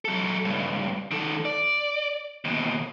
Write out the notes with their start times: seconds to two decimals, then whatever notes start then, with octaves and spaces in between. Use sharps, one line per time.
0.05 F#3 A4
0.45 C#2 G2
1.11 D#3 A4
1.45 D5
2.45 D#2 B2